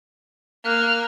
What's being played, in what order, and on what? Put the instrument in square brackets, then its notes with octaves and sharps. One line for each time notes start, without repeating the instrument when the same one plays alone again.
[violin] A#3 [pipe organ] F6 F#6